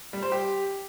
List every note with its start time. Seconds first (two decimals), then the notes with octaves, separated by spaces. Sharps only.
0.13 G3
0.22 C5
0.32 G4